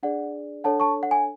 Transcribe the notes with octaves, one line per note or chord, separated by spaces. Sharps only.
D4 G#4 D5 F#5
D4 A4 C#5 F#5 A5
A5 C#6
F#5
G#5